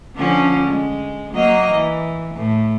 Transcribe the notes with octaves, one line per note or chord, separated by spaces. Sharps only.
D3 F3 C#4
G#3
F#3 A#3 D#5
E3
A2